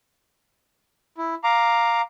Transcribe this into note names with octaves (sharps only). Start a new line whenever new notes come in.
E4
F5 A#5 D6